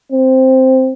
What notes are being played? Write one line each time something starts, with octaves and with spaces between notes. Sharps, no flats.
C4